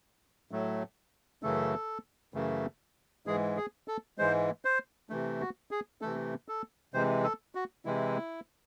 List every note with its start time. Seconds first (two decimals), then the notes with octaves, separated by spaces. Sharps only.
0.51 A2 F#3 A3
1.43 F#2 C#3 E3 A3 A4
2.34 F#2 C#3 E3 A3
3.26 G#2 E3 G#3 G#4
3.57 G#4
3.88 A4
4.18 G#2 E3 G#3 C5
4.65 C5
5.10 C3 E3 A3
5.41 F#4
5.71 G#4
6.01 C3 E3 A3 A4
6.48 A4
6.94 C3 E3 G#3 C5
7.24 A4
7.55 F#4
7.85 C3 E3 G#3 E4